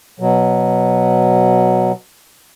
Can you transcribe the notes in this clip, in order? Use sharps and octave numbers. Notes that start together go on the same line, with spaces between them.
B2 F#3